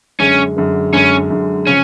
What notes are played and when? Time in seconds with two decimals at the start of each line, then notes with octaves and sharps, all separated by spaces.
0.20 F#2 D3 G#3 C#4
0.57 F#2 D3 G#3
0.93 F#2 D3 G#3 C#4
1.30 F#2 D3 G#3
1.66 C#3 F3 C#4